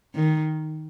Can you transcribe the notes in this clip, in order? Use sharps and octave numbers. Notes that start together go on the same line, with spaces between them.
D#3